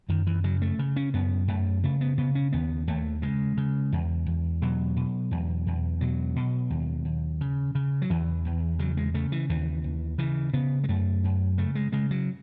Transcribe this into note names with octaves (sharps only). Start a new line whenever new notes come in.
F#2 D#3
E3
C#3 F#3
A3
C#3
C#4
F#2 B3
F#2 A3
C#3 A3
B3
C#3 B3
C#4
D#2 B3
D#2 A3
C#3 G#3
C#3
E2
E2
B2 F#3
B2
E2
E2
B2 F#3
B2
D#2
D#2
C#3
C#3
F#3
E2 E3
E2
C#3 F#3
G#3
C#3 A3
E3
D#2 E3
D#2
C#3 E3
C#3 B3
G#3
F#2 A3
F#2
C#3 A3
G#3
C#3 G#3
F#3